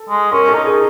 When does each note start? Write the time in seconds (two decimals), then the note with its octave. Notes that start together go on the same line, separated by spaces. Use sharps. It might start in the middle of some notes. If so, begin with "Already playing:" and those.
Already playing: A4
0.09 G#3
0.32 C#4 A#4
0.49 A4
0.54 D#4
0.66 G#4